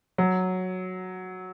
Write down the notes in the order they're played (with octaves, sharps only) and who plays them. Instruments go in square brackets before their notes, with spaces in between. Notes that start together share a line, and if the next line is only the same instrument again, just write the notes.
[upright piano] F#3